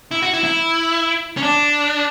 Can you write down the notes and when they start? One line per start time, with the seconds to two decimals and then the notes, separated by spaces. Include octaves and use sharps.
0.11 E4
0.22 F#4
0.34 E4
0.44 E4
1.37 C#4
1.43 D4